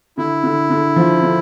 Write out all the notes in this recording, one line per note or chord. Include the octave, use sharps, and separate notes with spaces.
D3 E4
D3
D3
F3
D3